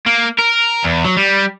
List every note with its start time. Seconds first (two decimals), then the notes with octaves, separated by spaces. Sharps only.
0.06 A#3
0.38 A#4
0.84 E2
1.05 F#3
1.17 G3